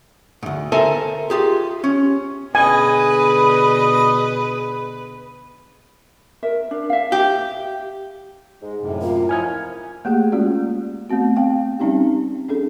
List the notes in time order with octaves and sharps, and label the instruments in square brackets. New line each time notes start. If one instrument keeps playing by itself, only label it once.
[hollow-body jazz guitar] D2 G#2
A4 A#4 C5 E5 G#5 A5
F4 G4 G#4
C#4
[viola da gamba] B2 D3 G#4 [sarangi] B4 [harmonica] D#5 [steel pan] G#5
[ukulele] A#4 E5
D4
E5 F5
[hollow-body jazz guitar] G4
[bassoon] G#2 [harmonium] G#3
[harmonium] F#2 A2 C3
[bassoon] A#3 [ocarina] F4
[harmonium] F3 D#4 E4 [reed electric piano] G#5 F6 G#6
[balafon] A3 A#3 G4 G#4
G#3 A#3 C#4 F4 F#4 D5
A3 B3 C4 F#4
C4 F5 G5
G3 C4 C#4 D#4 G4
C#4 D4 G#4 A4